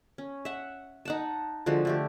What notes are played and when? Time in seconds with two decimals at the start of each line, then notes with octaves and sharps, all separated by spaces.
0.18 C#4
0.45 E5 F#5
1.05 D#4 F#5 A5
1.66 D3 F3 G#3 F#4
1.85 D3 A3 G4